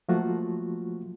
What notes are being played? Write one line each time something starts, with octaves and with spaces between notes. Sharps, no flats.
F3 F#3 A3 A#3 F4 F#4